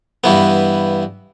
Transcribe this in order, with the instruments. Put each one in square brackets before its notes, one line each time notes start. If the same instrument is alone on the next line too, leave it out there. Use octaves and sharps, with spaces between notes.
[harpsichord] G2 E3 B3